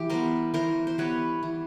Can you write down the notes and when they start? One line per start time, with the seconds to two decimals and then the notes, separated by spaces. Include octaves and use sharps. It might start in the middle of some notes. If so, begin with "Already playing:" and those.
Already playing: E3 G4
0.10 G3 B3 A#4 C5
0.54 E3 A#4 C5
0.87 C5
0.98 G3 B3 B4 C#5
1.43 E3